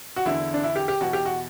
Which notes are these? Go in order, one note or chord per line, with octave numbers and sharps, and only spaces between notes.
F#4
E2 D3 E4
D4
E4
G4
G4
E2 B2 F#4
G4
F#4